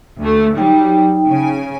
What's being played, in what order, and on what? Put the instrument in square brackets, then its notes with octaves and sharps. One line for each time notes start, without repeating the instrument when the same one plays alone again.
[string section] D2 A3
[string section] F#3 G3 [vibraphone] D#4 G5
[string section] C#3 G#5